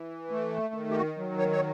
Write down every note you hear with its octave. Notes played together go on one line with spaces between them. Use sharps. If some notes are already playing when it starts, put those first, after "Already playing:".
Already playing: E3
A3
D#3
G4
F#4
F#3
C#5
C#5